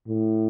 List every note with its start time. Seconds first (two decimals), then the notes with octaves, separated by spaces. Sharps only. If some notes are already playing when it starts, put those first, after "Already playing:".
0.08 A2